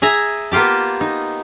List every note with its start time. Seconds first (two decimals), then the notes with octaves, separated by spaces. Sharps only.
0.02 G#4 E5 G#5 A#5
0.51 A#3 B3 F4 G4 A5
1.01 D#4